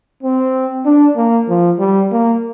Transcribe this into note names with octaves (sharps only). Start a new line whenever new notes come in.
C4
D4
A#3
F3
G3
A#3